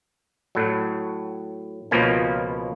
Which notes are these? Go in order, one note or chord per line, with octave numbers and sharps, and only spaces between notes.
A2 F#3
C#2 B2 F3 A#3 C#4